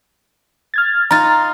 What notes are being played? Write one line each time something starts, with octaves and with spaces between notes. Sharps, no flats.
F6 G#6 A6
D#4 F4 A#5 A6